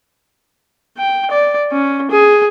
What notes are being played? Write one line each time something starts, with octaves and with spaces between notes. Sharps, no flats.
G5
D5
C#4
G#4